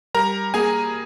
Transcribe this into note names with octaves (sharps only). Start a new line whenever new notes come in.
G3 A#4 A#5
A#3 G#4 G#5